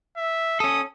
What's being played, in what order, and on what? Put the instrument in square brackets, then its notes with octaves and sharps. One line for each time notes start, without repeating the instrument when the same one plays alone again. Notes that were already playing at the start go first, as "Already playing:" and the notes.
[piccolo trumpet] E5
[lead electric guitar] C#4 A4 [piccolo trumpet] D#6